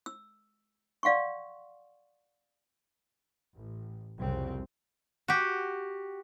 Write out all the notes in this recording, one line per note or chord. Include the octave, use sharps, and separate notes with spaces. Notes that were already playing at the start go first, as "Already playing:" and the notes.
E6
D5 F5 F#5 C6 C#6
A1
C2 F2 C#3 C4
F#4 G4